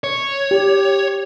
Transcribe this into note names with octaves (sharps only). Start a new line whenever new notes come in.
C#5
G4